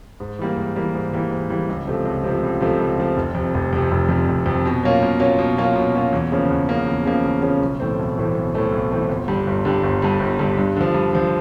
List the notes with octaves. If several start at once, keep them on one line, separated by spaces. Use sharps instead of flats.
G#2
E3 G3 A#3
G#2
E3 G3 A#3
G#2
E3 G3 A#3
G#2
E3 G3 A#3
C#2
C3 F3 A3
C#2
C3 F3 A3
C#2
C3 F3 A3
C#2
C3 F3 A3
F1
F2 C3
F1
F2 C3
F1
F2 C3
F1
F2 C3
B2
F#3 A#3 C#4 F4
B2
F#3 A#3 C#4 F4
B2
F#3 A#3 C#4 F4
B2
F#3 A#3 C#4 F4
E2
C#3 F3 A#3 C#4
E2
C#3 F3 A#3 C#4
E2
C#3 F3 A#3 C#4
E2
C#3 F3 A#3 C#4
B1
A2 E3 A3 C4
B1
A2 E3 A3 C4
B1
A2 E3 A3 C4
B1
A2 E3 A3 C4
G1
G2 D3 G3
G1
G2 D3 G3
G1
G2 D3 G3
G1
G2 D3 G3
G2
D3 F3
G2
D3 F3